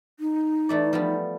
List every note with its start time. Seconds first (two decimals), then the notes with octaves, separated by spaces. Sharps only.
0.20 D#4
0.69 E3 A3 D5
0.93 F3 G3 B3